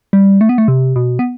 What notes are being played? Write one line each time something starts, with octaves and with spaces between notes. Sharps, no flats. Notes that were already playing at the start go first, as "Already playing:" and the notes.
G3
A3
B3
A3
C3
B2
B3